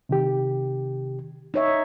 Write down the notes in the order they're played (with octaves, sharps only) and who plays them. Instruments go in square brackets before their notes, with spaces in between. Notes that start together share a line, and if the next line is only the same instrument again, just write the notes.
[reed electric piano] C3 D#3 G4
[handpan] D#4 C#5 E5